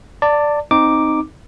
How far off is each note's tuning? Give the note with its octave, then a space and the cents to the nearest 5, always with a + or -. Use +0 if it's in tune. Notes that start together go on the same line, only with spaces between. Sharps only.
D5 +0 A5 +30
C4 +0 D#4 +0 D6 +0